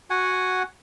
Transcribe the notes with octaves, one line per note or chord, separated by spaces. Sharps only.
F#4 F#5 G#5